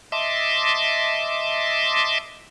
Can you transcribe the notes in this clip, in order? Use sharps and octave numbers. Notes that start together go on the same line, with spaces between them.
D#5 E5 A5 C6 D6